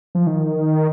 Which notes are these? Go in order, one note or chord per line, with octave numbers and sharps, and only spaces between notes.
F3
D#3